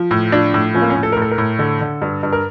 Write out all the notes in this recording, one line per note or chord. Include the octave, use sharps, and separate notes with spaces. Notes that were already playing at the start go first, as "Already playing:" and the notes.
Already playing: F3
A2
F3 D4
A2
F3 C#4
A#3
C#4
A2
A4
A2 A#4
A4
A#4
A2
D3 A4
D3
G2
G2
A#4